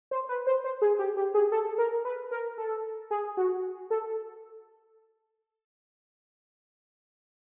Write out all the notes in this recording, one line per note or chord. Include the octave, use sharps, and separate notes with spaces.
C5
B4
C5
C5
G#4
G4
G4
G#4
A4
A#4
B4
A#4
A4
G#4
F#4
A4